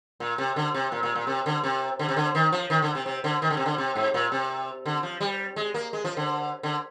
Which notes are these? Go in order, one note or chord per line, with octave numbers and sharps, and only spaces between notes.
A#2
C3
D3
C3
A#2
A#2
A#2
C3
D3
C3
D3
C3
D3
D#3
F3
D#3
D3
C3
C3
D3
D#3
D3
C3
D3
C3
G#2
A#2
C3
D3
F3
G3
G#3
A#3
G#3
F3
D3
D3